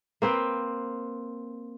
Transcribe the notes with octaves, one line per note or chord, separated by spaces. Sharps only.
A#3 C4 B4 G5